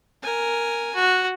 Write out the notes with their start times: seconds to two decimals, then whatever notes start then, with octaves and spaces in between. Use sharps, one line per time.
0.23 A#4 G#5
0.95 F#4